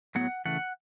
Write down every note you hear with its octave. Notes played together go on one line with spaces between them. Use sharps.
A2 F#3 B3 F#5
C#3 E3 A3 F#5